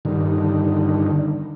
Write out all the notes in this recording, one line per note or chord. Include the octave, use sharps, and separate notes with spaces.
G2 D3 D#3